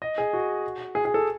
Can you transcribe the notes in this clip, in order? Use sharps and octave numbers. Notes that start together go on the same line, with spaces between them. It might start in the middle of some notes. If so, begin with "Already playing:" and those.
D#5
G#4
F#4
G#4
G#4
A4